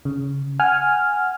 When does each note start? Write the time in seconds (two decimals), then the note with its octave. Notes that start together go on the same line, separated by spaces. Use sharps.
0.05 C#3
0.60 F#5 G#5 F6